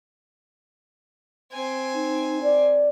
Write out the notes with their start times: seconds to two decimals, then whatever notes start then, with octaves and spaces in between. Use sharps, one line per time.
1.52 C4 G#5
1.95 D#4
2.42 D5